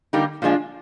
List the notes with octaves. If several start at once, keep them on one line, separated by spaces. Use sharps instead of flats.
D3 G3 A#3 D#4 G4
A#2 F3 G#3 D4 F4